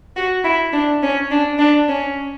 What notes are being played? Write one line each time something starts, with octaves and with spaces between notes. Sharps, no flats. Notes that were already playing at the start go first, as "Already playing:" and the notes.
F#4
E4
D4
C#4
D4
D4
C#4